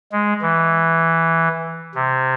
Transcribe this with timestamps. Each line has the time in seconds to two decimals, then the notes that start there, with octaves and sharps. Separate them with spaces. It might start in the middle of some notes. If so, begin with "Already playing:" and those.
0.12 G#3
0.42 E3
1.95 C3